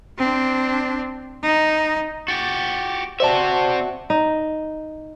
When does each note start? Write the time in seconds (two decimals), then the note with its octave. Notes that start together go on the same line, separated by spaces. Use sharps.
0.18 C4 D4
1.43 D#4
2.28 F#4 G4 A6
3.20 C4 F#4 C5 D5 E5 A5
4.10 D#4